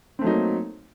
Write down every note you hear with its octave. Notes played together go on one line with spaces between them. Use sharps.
F#3 A3 A#3 C4 D#4